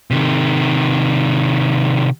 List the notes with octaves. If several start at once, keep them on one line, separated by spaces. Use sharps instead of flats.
C3 D#3